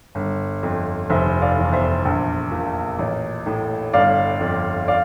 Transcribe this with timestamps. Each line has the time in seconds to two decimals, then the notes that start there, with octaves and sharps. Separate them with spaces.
0.15 G1
0.63 F2
1.10 F1 C5 E5
1.41 D5 F5
1.57 E2
1.73 C5 E5
2.05 A#1
2.51 A#2
2.99 A1
3.46 A2
3.93 G1 D5 F5
4.41 F2
4.88 D5 F5